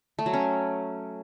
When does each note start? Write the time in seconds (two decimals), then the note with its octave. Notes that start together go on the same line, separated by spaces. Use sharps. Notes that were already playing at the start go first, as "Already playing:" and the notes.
0.19 A3
0.26 F#3
0.33 C#4